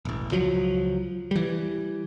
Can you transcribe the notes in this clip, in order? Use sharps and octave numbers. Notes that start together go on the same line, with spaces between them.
E1 A1
C#2 F3 F#3
E3 G3